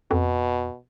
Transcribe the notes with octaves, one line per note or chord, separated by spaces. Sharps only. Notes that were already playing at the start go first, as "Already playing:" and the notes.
F2 B2